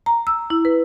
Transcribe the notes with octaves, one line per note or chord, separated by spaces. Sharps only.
A#5
E6
E4
B4